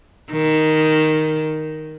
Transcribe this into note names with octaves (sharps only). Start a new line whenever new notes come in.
D#3